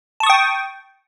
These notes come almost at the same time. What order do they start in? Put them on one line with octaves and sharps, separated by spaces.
A5 C#6 D#6 G5